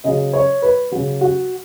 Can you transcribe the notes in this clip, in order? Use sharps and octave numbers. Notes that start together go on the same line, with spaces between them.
C#3 F#3 D#5
C#5
B4
C#3 F#3 F#4
F#4